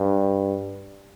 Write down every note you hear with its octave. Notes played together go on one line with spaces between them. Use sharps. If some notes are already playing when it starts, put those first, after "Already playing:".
Already playing: G2